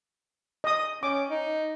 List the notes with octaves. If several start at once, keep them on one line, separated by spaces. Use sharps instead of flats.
D#5 D#6
C#4 D6
D#4